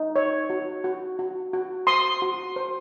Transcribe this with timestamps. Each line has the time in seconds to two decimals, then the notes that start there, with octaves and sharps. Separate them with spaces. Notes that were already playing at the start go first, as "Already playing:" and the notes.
Already playing: D#4
0.16 C#5
0.50 F#4
0.84 F#4
1.19 F#4
1.53 F#4
1.87 C5 C6 D#6
2.22 F#4
2.56 C5